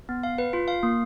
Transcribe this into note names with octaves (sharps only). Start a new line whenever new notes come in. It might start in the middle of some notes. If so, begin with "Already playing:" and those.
B3
F5
B4
F4
F5
A#3